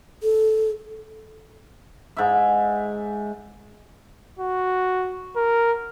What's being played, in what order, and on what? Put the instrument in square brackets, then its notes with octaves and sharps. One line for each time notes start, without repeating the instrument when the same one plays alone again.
[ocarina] A4
[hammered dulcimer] G#2 E5
[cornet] F#4
A#4